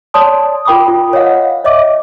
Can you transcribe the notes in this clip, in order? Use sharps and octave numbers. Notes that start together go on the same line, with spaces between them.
C#5 D5 A5 C6 D#6
F4 A#4 G5 B5 D6 D#6
F4
C#5 D#5 F5 F#5
C#5 D#5 E5 D6